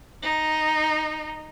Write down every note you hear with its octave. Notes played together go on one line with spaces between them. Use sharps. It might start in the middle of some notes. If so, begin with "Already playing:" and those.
D#4